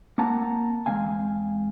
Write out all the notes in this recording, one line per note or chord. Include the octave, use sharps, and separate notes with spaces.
A#3 C4 F#5 A5 A#5
E2 G#3 C4 F5 G#5